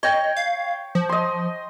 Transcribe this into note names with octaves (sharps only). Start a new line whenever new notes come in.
C#5 D#5 G5
F5
F3
D#5 C6